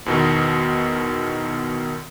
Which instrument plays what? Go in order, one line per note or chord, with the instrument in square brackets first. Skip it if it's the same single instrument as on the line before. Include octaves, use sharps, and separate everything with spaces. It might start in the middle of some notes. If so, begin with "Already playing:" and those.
[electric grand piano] E2 B2 D#3